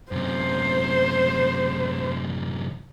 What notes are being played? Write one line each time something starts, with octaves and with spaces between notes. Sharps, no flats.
F#2 C3 C5